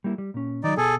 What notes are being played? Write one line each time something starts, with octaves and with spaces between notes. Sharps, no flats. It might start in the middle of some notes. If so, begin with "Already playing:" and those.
G3 A#3 E4
G3
A#2 C#4
D#3 F#3 D#4 D5
B2 G#4 A4